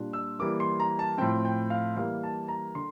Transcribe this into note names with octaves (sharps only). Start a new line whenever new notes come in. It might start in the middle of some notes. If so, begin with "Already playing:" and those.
Already playing: A#2 G3 D4 F4
E6
E3 G3 A#3 D6
C6
A#5
A5
A2 F3 C4 G5
G5
F5
E3 G3 A#3 F5
A5
A#5
D3 C6